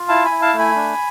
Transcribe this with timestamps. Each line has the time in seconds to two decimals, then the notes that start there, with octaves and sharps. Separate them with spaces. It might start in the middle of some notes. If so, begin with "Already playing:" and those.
Already playing: F4
0.08 E4 F5 A5
0.25 G#5 B5
0.31 E4
0.42 F5 A5
0.53 A3
0.59 G#5 B5
0.76 D4